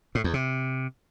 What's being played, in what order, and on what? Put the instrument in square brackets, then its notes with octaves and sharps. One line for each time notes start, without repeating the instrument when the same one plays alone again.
[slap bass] A2
E2
C3